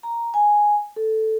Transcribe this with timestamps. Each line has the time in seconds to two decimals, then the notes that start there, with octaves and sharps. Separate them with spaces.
0.03 A#5
0.34 G#5
0.96 A4